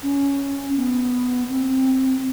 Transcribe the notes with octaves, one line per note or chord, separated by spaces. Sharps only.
C#4
B3
C4